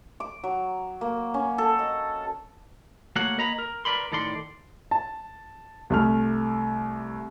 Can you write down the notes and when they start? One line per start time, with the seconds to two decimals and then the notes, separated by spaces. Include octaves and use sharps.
0.20 D6
0.44 F#3
1.01 A#3
1.34 C#4
1.58 A4
1.79 D#5
3.16 A3 A#3 F#4 A#4 C#5 F#5
3.38 A#3 D#5 A#5 B5
3.59 A#4
3.85 A#4 B4 D5 B5 C6
4.12 A2 D#3 A4 D5 C6
4.91 A5
5.90 C2 A3 F6